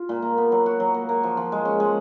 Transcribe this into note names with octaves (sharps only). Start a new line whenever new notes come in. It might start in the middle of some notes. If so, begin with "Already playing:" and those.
Already playing: F4
A#2
A#3
B3
F#3
F#4
F#3
A#3
A#3
F3
F3
G#3
C#4
G#3